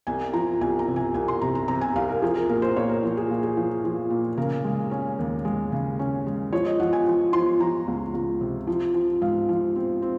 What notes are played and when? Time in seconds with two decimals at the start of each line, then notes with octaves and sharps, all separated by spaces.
0.07 C2 G#5
0.33 F3 A#5
0.61 C2 G#5
0.79 A#5
0.88 C3
0.96 G#5
1.14 C2 G#5
1.28 C6
1.41 C3 A#5
1.55 A#5
1.68 C3 A#5
1.81 G#5
1.96 C2 F5
2.09 A#4
2.22 F3 G#4
2.35 A#4
2.49 A#2 A#4
2.62 C5
2.76 A#2 C#5
2.89 A#4
3.03 F3
3.17 G#4
3.30 A#2
3.43 G#4
3.57 F3
3.84 F3
4.10 A#2
4.38 C#3 A#4
4.64 G#3
4.91 C#4
5.19 D#2
5.45 G#3
5.72 C#3
5.99 C#4
6.26 G#3
6.53 F3 C#5
6.66 D#5
6.80 F3 F#5
6.93 G#5
7.07 F3
7.33 F3 C6
7.60 F3 A#5
7.88 C#2
8.14 C#2
8.41 C3
8.67 F3
8.94 F3
9.22 G#2 F5
9.49 F3
9.76 C4
10.02 C4